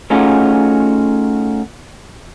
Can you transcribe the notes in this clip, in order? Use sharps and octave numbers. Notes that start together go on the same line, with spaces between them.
A3 C#4 D#4 F4 F#4 G#4